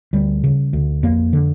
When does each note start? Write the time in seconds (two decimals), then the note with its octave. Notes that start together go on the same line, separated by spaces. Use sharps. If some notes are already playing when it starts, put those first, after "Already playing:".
0.13 D2 G3
0.44 C#3
0.73 D2
1.03 F2 A#3
1.33 D3